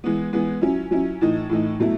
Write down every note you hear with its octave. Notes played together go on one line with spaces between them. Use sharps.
E3 G#3 B3
E3 G#3 B3
F#3 C#4 E4
F#3 C#4 E4
A2 E3 A3 D#4
A2 E3 A3 D#4
B2 F#3 A3 E4